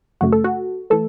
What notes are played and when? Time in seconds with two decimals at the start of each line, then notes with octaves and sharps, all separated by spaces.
0.21 F#2 C#3 A3 F#4
0.32 A4
0.44 F#4
0.90 E3 A3 A4